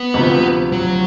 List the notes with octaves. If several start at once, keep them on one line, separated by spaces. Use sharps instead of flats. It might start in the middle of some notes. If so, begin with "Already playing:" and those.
Already playing: B3
D2 C3 F3
F#3